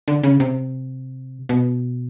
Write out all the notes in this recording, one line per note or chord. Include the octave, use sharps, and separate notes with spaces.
D3
C#3
C3
B2